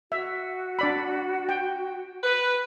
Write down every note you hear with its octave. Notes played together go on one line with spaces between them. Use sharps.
F#4 E5
D4 D5 B5
G5
B4